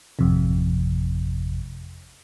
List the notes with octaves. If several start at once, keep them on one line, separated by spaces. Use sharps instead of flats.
G#1 F2 C3